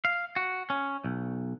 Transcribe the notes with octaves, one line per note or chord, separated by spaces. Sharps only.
F5
F#4
C#4
B1